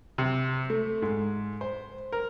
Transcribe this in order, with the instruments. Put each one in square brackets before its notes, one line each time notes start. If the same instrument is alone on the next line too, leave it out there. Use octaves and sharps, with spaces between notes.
[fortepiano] C3
A3
G#2
C5
A#4